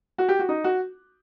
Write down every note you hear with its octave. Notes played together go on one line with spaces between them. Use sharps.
F#4
G4
F#4
D#4
F#4